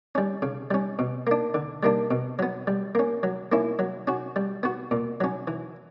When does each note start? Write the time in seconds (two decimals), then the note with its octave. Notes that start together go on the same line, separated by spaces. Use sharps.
0.15 G3 C#4
0.42 C#3
0.71 G3 C#4
0.99 B2
1.27 A#3 D4
1.54 D3
1.83 G3 A#3 D4
2.11 B2
2.39 F#3 B3
2.67 G3
2.95 A#3 C#4
3.23 F#3
3.52 A#3 C#4 E4
3.79 F#3
4.07 C#4 F#4
4.36 G3
4.63 B3 F#4
4.91 A#2
5.21 F#3 C#4
5.47 E3